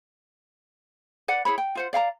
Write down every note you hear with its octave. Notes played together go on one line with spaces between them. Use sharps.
B4 D5 F#5
E4 G#4 C#5 B5
G5
F4 C5 F#5
D5 F5 G5 A#5